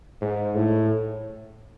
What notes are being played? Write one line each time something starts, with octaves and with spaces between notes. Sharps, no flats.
G#2
A2